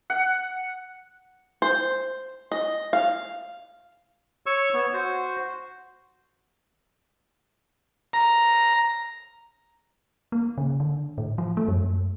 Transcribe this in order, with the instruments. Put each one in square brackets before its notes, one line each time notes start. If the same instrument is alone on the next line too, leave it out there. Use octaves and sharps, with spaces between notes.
[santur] F#5
[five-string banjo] C5
D#5
F5
[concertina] C#5 C#6 E6
B3 C#5
F#4 C5
[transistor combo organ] A#5
[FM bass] A#3
C#3
D3
A2
F3
A3
F#2